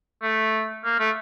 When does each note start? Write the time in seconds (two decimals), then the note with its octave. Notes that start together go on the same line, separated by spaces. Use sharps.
0.22 A3
0.84 A#3
0.99 A3